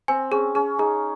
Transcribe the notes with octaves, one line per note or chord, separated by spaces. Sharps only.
C4 G#5
C#4 G#4
C#4 G#4
D#4 G#4